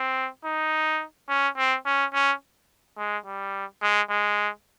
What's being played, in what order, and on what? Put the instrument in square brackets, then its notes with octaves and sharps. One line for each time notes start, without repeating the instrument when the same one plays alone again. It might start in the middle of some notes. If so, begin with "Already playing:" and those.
Already playing: [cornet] C4
D#4
C#4
C4
C#4
C#4
G#3
G3
G#3
G#3